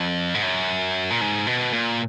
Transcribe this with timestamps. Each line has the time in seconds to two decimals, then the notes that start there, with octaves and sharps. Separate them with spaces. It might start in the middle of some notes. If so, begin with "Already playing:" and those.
Already playing: F2
0.34 G#2
0.43 F#2
1.11 A#2
1.21 G#2
1.47 B2
1.73 A#2